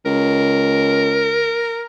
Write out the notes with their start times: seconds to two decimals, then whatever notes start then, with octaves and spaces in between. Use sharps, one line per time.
0.05 C#2 A#4